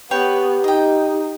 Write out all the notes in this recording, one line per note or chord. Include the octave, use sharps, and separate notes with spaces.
B3 G4 B4 C#5 G5
D#4 D#5 G5